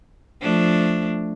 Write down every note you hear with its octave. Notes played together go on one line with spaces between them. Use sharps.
F3 A3 D4